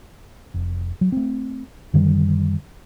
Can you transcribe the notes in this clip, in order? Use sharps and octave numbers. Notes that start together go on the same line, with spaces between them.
F1
F#3
A3 C4
F#2 D3 D#3 G3